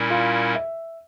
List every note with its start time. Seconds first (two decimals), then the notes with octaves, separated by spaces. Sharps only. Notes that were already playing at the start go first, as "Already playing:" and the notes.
Already playing: A#2 G3 C#4 E4 A#4
0.10 F4
0.55 E5